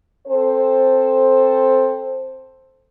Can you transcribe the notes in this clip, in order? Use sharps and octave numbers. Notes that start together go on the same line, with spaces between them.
C4 A4 C5